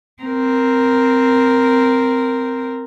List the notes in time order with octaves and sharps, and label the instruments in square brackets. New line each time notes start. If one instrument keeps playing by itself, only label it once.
[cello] C4 A#4